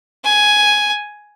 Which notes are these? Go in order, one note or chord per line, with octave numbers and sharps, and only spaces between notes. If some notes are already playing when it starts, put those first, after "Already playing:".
G#5